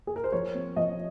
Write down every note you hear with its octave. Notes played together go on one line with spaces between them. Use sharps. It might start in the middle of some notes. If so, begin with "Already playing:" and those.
G#4
A#4
C5
F3 C#5
C4
F3 D#5